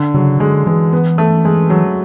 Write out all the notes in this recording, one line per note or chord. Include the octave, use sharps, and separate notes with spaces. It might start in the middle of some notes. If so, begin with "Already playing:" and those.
Already playing: D3
C#3 F#3
D3 G#3
E3 G#3
B3
A3
G#3
F#3